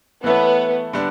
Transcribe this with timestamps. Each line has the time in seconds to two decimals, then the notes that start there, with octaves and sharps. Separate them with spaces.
0.24 E3 A3 B3 E4 A4 C#5
0.93 D3 G3 B3 D4